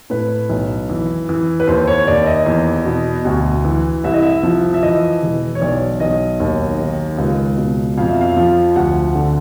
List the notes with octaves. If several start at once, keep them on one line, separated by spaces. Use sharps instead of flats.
A2 B4
B1
E3
E3
B4
D#2 C5
C#5
D#2 D5
E5
D#5
E2
B2
D2
E3
C2 E5
D#5
E5
F3
E5
E3 D#5
E1
C#5
B1 D5
B1 D#5
D#2
D#3
C#2
B2
F2 F5
E5
F5
F3
D2 F#5
D3